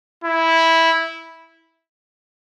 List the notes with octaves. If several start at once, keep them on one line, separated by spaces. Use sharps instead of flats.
E4